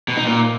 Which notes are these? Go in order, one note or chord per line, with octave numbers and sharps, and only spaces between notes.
B2
D#4
A#2